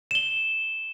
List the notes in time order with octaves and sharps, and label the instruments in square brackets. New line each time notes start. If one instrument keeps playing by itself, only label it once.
[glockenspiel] E7 G7